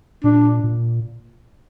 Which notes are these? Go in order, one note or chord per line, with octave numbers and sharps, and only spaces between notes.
A#2 D4
A#2